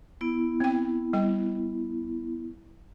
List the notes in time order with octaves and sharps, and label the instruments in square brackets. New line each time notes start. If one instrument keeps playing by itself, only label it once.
[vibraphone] B3 E4
[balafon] C4 G5
G3 G5